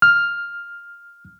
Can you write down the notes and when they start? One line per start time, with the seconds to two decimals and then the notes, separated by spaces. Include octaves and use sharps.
0.02 F6